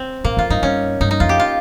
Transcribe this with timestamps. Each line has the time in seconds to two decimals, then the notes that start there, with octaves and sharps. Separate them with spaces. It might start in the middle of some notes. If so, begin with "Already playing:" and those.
Already playing: C4
0.24 A#2 A#3
0.37 F2 F4
0.50 G2 D#4
0.62 G2 C#4
1.00 G2 D#4
1.11 D#4
1.20 F2 F4
1.29 G4
1.40 F4